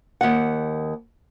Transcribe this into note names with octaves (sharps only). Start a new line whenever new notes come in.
D#2 F#5